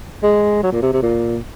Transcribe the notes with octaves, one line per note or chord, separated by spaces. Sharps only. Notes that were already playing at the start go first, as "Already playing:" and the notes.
G#3
F#3
A#2
C3
C3
A#2